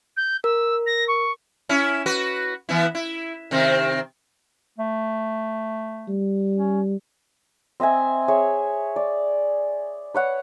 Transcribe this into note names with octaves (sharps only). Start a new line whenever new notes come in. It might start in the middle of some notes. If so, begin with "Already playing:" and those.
G6
A#4 E6
A#6
C#6
C#4 E4
F#4 B4
E3 B3 E4
E4
C3 D#3 C4
A3
G3
C#4
C4 D#5 E5 G#5
G#4 C#5 E5
D5
B4 C#5 F#5